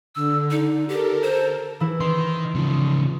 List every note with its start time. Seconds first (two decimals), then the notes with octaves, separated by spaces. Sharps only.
0.15 D3 E6
0.51 D#4
0.89 G4 A4 A#4
1.23 C5
1.80 E3 E4
2.00 D#3 C6
2.55 C#3 F3